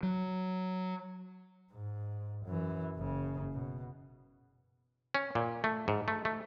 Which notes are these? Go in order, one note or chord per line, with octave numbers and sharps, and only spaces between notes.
F#3
G#2
F#2 E3
F#1 C#3
B2
C#4
A#2
A3
G#2
A3
A3